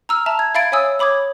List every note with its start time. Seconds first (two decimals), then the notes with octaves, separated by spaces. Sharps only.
0.09 A#5 E6 F6
0.26 E5 A5 A#5
0.39 G#6
0.55 E5 F5 B5 G#6 A6 D7
0.72 C#5 E5 G#5 D#6 E6
0.99 C#5 B5 D6 D#6 G#6